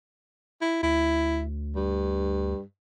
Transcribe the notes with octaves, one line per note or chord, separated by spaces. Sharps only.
E4
D2 E4
G2